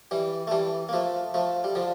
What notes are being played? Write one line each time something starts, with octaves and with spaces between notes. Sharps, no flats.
E3 G3
A3
E3 G3
A#3
F3 A3
F3 A3
G3
D3 F3